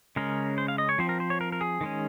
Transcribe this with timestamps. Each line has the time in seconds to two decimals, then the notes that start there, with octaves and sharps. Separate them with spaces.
0.16 C#3 G#3 C#4 A#4
0.58 C5
0.68 F5
0.78 D#5
0.89 C#5
0.98 F3 C4 C5
1.09 A#4
1.20 C5
1.30 C#5
1.41 A#4
1.52 A#4
1.61 G#4
1.81 D#3 G#3 C#4